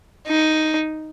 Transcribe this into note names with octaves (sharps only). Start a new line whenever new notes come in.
D#4